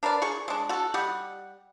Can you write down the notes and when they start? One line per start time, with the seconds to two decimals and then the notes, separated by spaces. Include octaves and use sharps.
0.03 D4 A#4 B4 D5
0.22 G#4 C#6
0.48 G#3 D4
0.69 F#4 A4
0.94 G3 G4 D#5 F#5